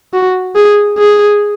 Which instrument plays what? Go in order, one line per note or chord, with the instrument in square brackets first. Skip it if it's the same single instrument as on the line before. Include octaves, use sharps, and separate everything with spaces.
[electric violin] F#4
G#4
G#4